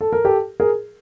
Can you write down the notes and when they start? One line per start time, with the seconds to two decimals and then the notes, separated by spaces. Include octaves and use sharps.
0.01 A4
0.13 A#4
0.25 G4 A4
0.60 G#4 A#4